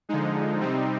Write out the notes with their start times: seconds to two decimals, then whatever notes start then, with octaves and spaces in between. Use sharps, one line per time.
0.09 D3 F3 G#3 D#4
0.60 C3 G3 C4 D#4